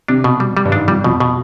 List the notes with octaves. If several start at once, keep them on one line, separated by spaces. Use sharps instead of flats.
C3 D4
B2
G3
G3
G2
G#2 D4
F2 G3
F2 B2
B2